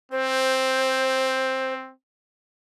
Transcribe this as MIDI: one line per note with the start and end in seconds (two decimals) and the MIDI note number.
0.12 1.92 60
0.12 1.74 72